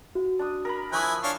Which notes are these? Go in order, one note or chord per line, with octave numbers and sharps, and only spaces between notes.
F#4
D4 D#6
A#4 A#5 B5
F3 E4 G#5 C#6 D#6 F#6
D4 C#5 F5